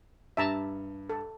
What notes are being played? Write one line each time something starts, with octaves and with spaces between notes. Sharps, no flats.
G2 E5 A5 A#5
A4